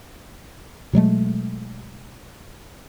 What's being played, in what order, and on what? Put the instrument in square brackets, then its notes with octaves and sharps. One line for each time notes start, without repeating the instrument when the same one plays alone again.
[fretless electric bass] B2 F#3 G#3 A3